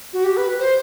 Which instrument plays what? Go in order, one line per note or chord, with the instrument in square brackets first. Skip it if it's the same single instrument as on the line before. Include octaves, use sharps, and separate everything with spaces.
[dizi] F#4
G4
B4
C5